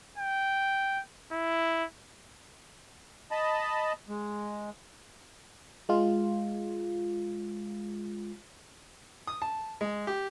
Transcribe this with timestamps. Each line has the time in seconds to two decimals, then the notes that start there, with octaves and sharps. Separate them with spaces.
0.18 G5
1.32 E4
3.31 D#5 A5 B5
4.09 G#3
5.89 G#3 F4
9.27 D#6
9.42 A5
9.81 G#3
10.07 G4